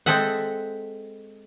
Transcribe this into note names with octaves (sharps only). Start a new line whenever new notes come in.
G#3 C4 A4 E5 F#5